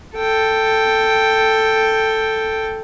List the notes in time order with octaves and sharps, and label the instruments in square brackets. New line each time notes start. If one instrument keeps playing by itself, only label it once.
[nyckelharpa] A4 G5